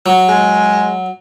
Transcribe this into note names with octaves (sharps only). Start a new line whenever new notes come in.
F#3
G#3